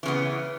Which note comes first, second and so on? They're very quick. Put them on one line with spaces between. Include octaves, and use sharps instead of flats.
E3 C#3 B3